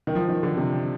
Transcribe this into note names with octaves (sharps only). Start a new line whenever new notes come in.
D#3
F3
D#3
D3
C3